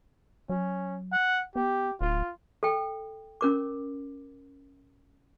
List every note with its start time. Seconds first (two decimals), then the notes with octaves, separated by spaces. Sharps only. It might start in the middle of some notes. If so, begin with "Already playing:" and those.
0.49 F#3 C#4
1.13 F#5
1.56 B3 G4
2.01 D1 F4
2.63 A4 G5
3.41 C#4 A#4 D6